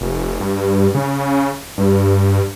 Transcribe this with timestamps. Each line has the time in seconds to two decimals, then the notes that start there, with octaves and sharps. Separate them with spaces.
0.01 F1
0.40 G2
0.95 C#3
1.78 G2